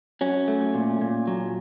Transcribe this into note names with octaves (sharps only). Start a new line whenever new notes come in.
F#3 C#4
A3
A#2
A#2
F#3